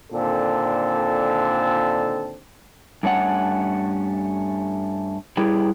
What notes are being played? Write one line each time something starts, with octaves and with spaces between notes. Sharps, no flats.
A#2 D3 D#3 C4 A4
G2 A3 C#4 F#5
G3 E4 G4 G#4 B4